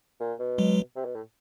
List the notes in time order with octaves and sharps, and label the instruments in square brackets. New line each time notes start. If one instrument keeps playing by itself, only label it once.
[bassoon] A#2
B2
[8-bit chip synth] F#3 G#3
[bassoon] C3
B2
A2